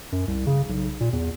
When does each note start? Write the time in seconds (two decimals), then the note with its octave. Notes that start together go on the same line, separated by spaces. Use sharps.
0.12 F#2
0.28 C2
0.47 C#3
0.69 B1
1.00 A#2
1.13 E2